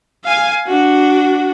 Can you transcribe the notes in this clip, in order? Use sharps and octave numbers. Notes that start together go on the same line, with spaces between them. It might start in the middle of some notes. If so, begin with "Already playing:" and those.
F5 G#5
D4 F#4